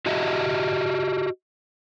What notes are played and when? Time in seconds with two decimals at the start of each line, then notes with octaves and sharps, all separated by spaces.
0.06 F#4 G4 D#5 E5